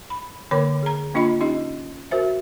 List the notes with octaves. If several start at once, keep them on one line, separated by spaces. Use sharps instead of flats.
B5
D3 A#3 A#4 C#5 B5 D6
G#4 A#5
A#3 D4 F4 D#5 B5
C#4 D#4 G4 D#5
F#4 A#4 C5 E5